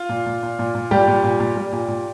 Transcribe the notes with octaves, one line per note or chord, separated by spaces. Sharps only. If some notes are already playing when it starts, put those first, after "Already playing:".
Already playing: F4
A#2
A#2
A#2
A#2
A#2
A#2 G3 G4
A#2
A#2
A#2
G3
A#2
A#2